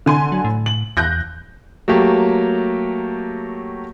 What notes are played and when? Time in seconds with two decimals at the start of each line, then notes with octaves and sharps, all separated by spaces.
0.06 D3 G#5 C6
0.32 F#3
0.45 A2
0.66 F#7
0.97 E2 F#6 G6 A#6
1.88 F#3 A3 A#3 G4